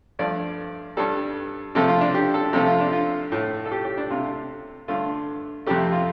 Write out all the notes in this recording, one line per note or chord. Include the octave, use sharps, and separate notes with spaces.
G2 F3 A3 D5
G2 G3 A4
C3 F3 A3 A4
F4
D4
G4
A4
C3 F3 A3 A4
F4
D4
F4
A2 A3
A4
G4
G4
D4
C3 A3 F4
G2 D3 A3 F4
F2 C3 A3 G4
F4